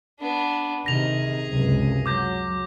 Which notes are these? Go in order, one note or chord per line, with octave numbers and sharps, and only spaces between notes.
B3 D4
C3 D#3 G#4 A#6 F7
C#2 F#2 C3
F#3 D6 G6 A#6